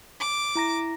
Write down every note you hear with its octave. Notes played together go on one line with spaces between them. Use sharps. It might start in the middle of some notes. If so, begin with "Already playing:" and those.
D6
E4 A#5 A#6